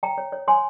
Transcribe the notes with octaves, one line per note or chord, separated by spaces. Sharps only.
C#5 G5 A#5
C#5
C#5
C#5 G#5 C6